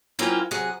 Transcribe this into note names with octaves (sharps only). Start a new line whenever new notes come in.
F#3 A#3 C4 C#4 E4 F4
C3 F#3 G#4 F#5